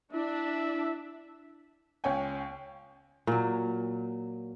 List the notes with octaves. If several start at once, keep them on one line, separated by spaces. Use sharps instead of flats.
D4 E4 E5
C#2 C#4 C#5 G5 G#5
A#2 F#3